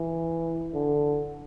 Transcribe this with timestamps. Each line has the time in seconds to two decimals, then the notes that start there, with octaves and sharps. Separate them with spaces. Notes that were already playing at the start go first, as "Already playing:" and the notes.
Already playing: E3
0.74 D3